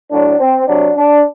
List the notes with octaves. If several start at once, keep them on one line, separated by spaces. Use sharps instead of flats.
A2 F#3 D4
C4
C3 F#3 D4
D4